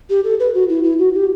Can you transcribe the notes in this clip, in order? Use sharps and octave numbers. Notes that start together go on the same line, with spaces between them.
G4
A4
B4
F#4
E4
E4
F#4
G4